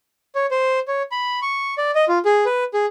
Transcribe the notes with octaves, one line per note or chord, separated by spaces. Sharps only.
C#5
C5
C#5
B5
C#6
D5
D#5
F4
G#4
B4
G#4